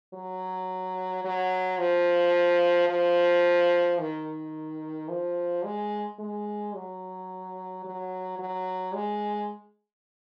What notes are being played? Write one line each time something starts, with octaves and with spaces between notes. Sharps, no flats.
F#3
F#3
F3
F3
D#3
F3
G#3
G#3
F#3
F#3
F#3
G#3